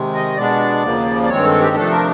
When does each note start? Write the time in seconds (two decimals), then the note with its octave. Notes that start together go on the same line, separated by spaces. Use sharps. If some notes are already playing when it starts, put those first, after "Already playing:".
Already playing: C3 D#3 G#3
0.14 D#5
0.37 B2 G#3 B3 D4 D5
0.83 D#2 C#3 F3 A#3
1.23 D5
1.29 G2 D#3 G#3 C4 C#5
1.45 A4
1.60 G4
1.75 C3 F3 A3 D4 A4
1.91 A#4